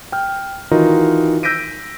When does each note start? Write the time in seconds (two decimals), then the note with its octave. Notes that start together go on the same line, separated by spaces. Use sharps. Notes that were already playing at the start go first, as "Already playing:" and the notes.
0.12 G5 F6
0.71 D#3 E3 D#4 F4 F#4 A#4
1.43 E6 G6 A#6 B6 D7 D#7